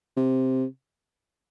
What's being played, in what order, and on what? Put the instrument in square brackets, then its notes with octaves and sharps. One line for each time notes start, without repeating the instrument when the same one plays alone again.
[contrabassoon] C3